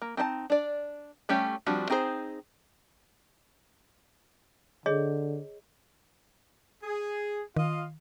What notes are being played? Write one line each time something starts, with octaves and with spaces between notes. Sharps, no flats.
A#3
C4 D#4 D#5 A5
D4 D5
G3 A3 C#4 G4
F3 G3 C4 D4 F#4
C4 D#4 G#4 A#4 C5
D3 G#4 C#5 D#5
G#4
D#3 F4 D#5 F5